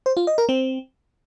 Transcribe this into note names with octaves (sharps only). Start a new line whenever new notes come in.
C5
F4
D#5
A#4
C4